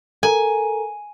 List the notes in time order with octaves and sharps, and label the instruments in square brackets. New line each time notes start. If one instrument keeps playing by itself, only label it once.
[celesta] A4 A#4 A#5 [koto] G#5